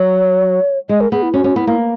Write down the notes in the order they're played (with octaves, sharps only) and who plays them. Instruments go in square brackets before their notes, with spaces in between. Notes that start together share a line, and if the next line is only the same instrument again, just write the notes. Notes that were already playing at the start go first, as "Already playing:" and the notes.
Already playing: [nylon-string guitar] F#3 [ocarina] C#5
[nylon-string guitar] G#3 [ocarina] D#5
[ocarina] A#4
[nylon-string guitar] B3 [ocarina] G#4
[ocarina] E4
[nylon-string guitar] C#4 [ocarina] F#4
[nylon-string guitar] C#4
[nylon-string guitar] B3 [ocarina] E4
[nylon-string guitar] A#3